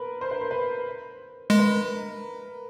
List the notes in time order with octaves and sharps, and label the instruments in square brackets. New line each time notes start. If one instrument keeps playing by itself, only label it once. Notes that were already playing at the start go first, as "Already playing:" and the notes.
Already playing: [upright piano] A#4 B4
C5
B4
A#4
B4
[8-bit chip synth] G#3 [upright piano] A#4
[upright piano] B4
A#4